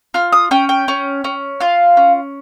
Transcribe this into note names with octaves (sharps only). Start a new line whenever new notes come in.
F4 F6
D#6
C#4 G5
G5
C#4
C#4
F4 F5
C#4